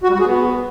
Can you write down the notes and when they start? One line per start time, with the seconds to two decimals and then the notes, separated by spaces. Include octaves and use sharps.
0.03 F#4
0.09 G3
0.14 F#4
0.20 G#4
0.26 B3